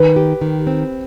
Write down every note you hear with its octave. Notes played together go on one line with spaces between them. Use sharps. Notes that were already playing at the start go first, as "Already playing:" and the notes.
Already playing: D#3 B4
G4
D#3
C4